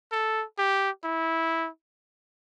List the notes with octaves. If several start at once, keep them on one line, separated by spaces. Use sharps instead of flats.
A4
G4
E4